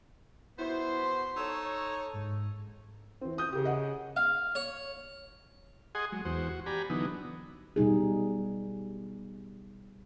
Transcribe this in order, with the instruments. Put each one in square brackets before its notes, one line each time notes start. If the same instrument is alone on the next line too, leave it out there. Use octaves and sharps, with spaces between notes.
[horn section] B3 F#4 C5 [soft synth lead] E4
[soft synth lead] C6
[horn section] D#4 A4 C#5 [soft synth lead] E6
[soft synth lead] G#2
[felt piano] E3 C4
D#6 G6
[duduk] C#3 [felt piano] G4 A#4
[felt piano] D#5 F#5
[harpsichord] F5
C#5
[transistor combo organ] G#4 D#5 F#5 G#5 C6
F#3 G#3
E2 F#4 C5
F#4
G4 D5 G#5 A#5 B5
D3 E3 F#3 B3 D#4
[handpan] B2 G3 D#4 G#4